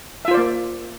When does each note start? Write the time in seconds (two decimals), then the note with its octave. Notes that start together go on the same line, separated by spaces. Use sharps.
0.25 E5
0.28 F4
0.31 C5
0.34 D5
0.37 A#3